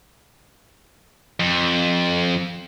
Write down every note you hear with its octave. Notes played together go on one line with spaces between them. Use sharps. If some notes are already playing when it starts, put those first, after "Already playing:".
F2